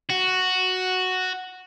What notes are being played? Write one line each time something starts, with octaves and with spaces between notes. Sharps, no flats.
F#4